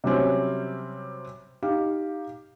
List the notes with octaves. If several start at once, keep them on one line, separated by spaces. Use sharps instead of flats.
C3 F#3 G3 C4 C#4
D#4 G4 F5